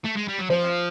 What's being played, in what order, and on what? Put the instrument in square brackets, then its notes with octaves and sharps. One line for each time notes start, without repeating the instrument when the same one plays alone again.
[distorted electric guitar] A3
G#3
G3
F#3
[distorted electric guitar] F3 [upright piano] C5